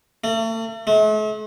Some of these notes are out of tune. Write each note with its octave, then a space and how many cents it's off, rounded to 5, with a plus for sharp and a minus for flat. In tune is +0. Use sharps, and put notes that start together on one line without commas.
A3 +40
A3 -45